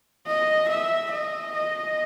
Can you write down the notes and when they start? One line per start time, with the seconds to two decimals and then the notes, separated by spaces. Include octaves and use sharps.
0.27 D#5
0.69 E5
1.11 D#5
1.54 D#5